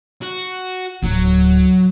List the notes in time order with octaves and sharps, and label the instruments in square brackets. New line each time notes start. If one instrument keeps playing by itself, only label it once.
[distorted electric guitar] F#4
[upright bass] D1 [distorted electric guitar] F#3